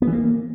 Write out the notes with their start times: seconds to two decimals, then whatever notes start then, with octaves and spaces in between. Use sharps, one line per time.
0.02 B3
0.07 E3
0.13 A#3